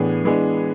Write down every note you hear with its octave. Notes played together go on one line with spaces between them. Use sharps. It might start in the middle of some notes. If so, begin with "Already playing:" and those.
Already playing: A2 E3 B3 D4 G#4
E3 G#3 B3 D4 G#4